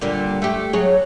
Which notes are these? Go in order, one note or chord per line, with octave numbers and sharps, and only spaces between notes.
A#2 D3 G3
A3 G4
F#3 G#4 C#5